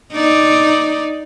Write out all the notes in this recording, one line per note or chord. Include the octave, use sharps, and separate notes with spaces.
D#4 D5